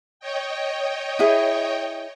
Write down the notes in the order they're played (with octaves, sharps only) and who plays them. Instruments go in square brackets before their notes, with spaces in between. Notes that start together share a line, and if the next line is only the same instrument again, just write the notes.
[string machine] C#5 D#5 G5
[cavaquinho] E4 G#4